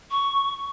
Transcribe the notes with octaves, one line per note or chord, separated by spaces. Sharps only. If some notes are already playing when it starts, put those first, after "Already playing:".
C#6